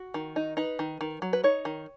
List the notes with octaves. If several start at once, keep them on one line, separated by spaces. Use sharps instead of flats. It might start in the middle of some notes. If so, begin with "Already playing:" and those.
Already playing: F#4
D#3
D#4
D#4 B4
D#3
D#3
F#3
B4
D#4 C#5
D#3